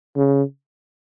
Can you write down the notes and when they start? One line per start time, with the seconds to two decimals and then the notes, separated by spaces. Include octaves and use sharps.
0.16 C#3